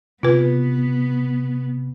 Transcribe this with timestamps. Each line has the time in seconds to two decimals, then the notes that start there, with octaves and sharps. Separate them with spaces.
0.23 C3 B3 F4 B4